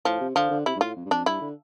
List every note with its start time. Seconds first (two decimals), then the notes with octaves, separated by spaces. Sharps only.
0.05 A2 F3
0.20 C3
0.35 D3 F3
0.51 D3
0.66 C3 E4
0.76 G2
0.81 A2 F4
0.96 F2
1.05 G2
1.10 F2 D4
1.26 G2 E4
1.41 D3